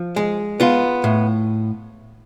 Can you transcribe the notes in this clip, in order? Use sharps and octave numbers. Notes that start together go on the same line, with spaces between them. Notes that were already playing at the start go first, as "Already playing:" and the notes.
Already playing: F3
G#3
B3 F4
A2